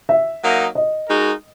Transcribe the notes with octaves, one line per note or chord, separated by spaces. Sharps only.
E5
F#3 A#3 D#4
D#5
G#3 D#4 F#4 A#4